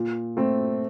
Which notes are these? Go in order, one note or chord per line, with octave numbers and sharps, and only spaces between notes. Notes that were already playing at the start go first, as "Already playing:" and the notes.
Already playing: A#2
A3 C4